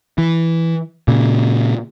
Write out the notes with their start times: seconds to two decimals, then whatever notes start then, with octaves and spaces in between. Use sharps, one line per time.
0.18 E3
1.08 A#2 C#3